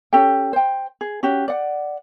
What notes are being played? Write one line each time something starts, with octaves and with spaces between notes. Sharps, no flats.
C#4 G4 A4 G5
C5 G5
G#4
C#4 F#4 G4
D5 F#5